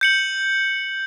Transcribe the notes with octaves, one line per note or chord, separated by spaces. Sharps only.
G6 C#7 F#7